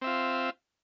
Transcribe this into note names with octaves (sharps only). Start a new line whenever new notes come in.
C4 F4 E5